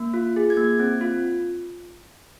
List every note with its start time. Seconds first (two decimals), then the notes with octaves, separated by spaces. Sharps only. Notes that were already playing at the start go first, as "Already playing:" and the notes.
Already playing: A#3
0.14 F4
0.36 G#4
0.50 G#6
0.57 A#3
0.64 G#6
0.80 C4
1.01 F4